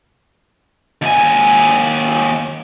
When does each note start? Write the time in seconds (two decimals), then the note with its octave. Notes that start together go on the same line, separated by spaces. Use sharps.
1.02 D#2 G#5